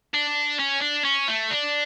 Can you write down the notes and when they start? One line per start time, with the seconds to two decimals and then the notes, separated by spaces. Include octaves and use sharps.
0.14 D4
0.59 C#4
0.81 D4
1.05 C#4
1.28 A3
1.50 D4